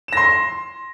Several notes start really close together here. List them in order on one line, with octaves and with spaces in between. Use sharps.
E7 A#6 C6